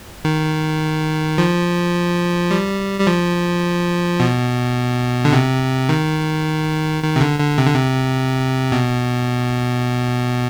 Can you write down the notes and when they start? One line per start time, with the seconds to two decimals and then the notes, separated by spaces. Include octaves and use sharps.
0.25 D#3
1.38 F3
2.51 G3
3.00 G3
3.07 F3
4.20 B2
5.25 D3
5.33 C3
5.89 D#3
7.03 D#3
7.16 C3
7.21 D3
7.39 D3
7.58 C3
7.66 D3
7.74 C3
8.72 B2